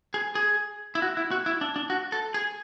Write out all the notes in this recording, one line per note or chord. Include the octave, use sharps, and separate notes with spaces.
G#4
G#4
E4
F#4
E4
F#4
E4
D4
D4
F#4
A4
G#4